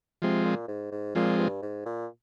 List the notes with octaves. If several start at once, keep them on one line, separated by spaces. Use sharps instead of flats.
C3 F3 G#3 C4
A#2
G#2
G#2
A#2 F3 G#3 C4
G2
G#2
A#2